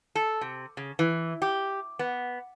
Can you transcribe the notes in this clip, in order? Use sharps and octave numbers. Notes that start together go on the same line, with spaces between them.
A4
C3
C#3
E3
G4
B3